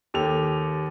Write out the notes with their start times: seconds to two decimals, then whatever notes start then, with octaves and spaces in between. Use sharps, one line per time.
0.14 D#2 G4 A4 F7